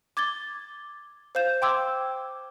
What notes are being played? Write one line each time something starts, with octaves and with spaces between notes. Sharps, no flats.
D6 G#6 A6 G7
C5 F5 G6 E7
G5 C6 D6 E6 G#6